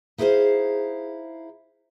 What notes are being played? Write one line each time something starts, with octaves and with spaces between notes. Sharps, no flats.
D#4 E4 G#4 B4 C5 F5